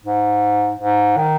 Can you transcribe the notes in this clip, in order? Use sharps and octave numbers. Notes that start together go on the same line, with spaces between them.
G#2
G#2
D#3